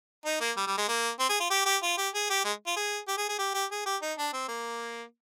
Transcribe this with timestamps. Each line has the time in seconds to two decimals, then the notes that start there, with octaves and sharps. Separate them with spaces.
0.25 D#4
0.41 A#3
0.57 G3
0.67 G3
0.78 G#3
0.88 A#3
1.19 C4
1.29 G#4
1.40 F4
1.50 G4
1.66 G4
1.83 F4
1.97 G4
2.14 G#4
2.30 G4
2.45 G#3
2.66 F4
2.76 G#4
3.08 G4
3.17 G#4
3.29 G#4
3.38 G4
3.54 G4
3.71 G#4
3.85 G4
4.02 D#4
4.18 D4
4.33 C4
4.48 A#3